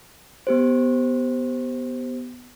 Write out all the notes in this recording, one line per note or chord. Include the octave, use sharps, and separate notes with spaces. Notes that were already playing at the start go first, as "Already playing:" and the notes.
B3 G4 C5